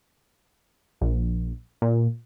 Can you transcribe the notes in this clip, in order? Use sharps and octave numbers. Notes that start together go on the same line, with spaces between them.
A#1
A#2